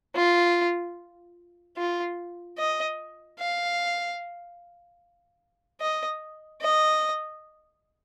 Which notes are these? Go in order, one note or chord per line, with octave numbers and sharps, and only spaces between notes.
F4
F4
D#5
F5
D#5
D#5